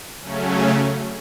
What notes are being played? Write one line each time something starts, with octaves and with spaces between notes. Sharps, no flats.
C#3 F#3 A3 C#4